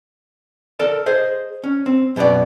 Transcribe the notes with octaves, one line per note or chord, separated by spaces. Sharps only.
A4 A#4 D5 A5
G#4 C5 D#5
C#4
C4
F#2 B2 B3 G4 D5